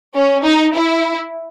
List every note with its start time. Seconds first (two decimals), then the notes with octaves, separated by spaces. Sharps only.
0.16 C#4
0.45 D#4
0.75 E4